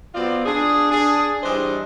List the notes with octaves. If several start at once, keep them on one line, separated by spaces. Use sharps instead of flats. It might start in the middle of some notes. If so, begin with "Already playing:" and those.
F#3 B3 C4 F4 D5
D4 G#4
D4 G#4
E3 G3 D4 C5 D#5